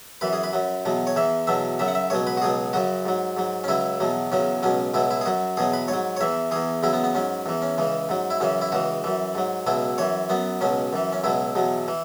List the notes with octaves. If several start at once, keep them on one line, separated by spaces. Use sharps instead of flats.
F#2 E3 B4
G#4
B4
F#2 F#3
E2 B2 F#3
C#5
E2 E3 E5
E2 B2 F#3 E5
F#2 C#3 F#3 E5
F#5
E5
C#2 B2 F#3 C#5
B4
F#4
C#2 B2 F#3 G#4
F#2 C#3 F#3 F#4
G#2 F#3
G#2 F#3
C#4
C#2 C#3 F#3 E4
E2 B2 F#3
E2 C#3 F#3 C#4
C#2 B2 F#3 C#4
C#2 B2 F#3 E4
E4
G#4
F#2 F#3 F#4
E2 B2 F#3 G#4
B4
G#2 C#5
F#3
C#5
E2 E3 E5
E2 E3 G#4
E2 C#3 F#3 E4
B3
B3
G#2 F#3 C#4
E2 E3
C#4
C#2 C#3 E3
G#2 F#3
E4
F#2 C#3 E3 C#4
E4
C#2 C#3 E3 F#4
F#2 E3
G#2 F#3
C#2 B2 F#3 E4
F#2 E3 C#5
F#2 F#3 B3
C#2 B2 F#3 C#4
F#2 E3
C#4
C#2 B2 F#3 E4
E2 B2 F#3
E3